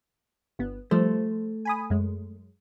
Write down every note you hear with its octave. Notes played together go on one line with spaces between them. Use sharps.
G1 B3
F3 G3 A3 C5
G#5 B5 D#6
F#2 G#3